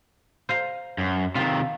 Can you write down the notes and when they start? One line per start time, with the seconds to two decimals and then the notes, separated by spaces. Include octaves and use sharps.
0.49 C5 F5 A#5
0.98 F#2
1.35 C3 D#3 F4